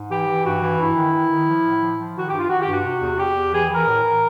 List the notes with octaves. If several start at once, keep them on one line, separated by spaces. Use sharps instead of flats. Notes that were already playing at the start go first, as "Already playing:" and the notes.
Already playing: G#2
E3 G4
E3
G2 F#4
E3
G2 E4
D#3
D#3
D#3
F3
A2
F3
F3
D#3 F#4
G2 G4
F4
D#3 F#4
G4
G2
F#4
C3
E2
E2 G4
E2
E3 G#4
E3 A#4
A2
E3